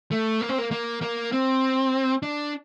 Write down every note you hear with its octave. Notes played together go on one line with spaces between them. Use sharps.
A3
A#3
C4
A#3
A#3
A#3
C4
D4